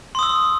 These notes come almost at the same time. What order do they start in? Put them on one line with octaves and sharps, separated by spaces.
C6 D#6 E6